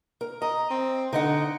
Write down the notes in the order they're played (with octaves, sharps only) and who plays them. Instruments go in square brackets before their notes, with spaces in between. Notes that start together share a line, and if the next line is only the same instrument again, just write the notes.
[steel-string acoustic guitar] A#4
[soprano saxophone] D#5 [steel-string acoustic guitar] A#5
[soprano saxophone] C4
[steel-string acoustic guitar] D3 D#5 F#5 [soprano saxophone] D#4